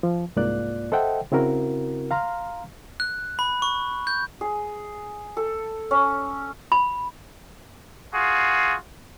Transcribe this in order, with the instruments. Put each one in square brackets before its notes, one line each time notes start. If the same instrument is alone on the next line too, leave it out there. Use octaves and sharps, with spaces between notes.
[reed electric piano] F3
C2 G#2 A#3 F4 D5 F#6
A4 C5 D#5 E5 F#5 G5
C#3 C4 E4 F#4 A#4
F5 A#5 C6 F6
[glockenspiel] F#6
B5
C#6
G6
[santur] G#4
A4
C#4
[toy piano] B5
[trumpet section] F4 F#4 G#4